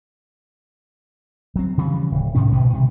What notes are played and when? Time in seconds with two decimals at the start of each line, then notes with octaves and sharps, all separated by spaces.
1.56 F#3 C4
1.78 C#3 E3 F3 G3
2.11 D1
2.35 G#2 C3 D#3 C#4
2.52 A1 A#2 G#3
2.73 C3 D#3 G3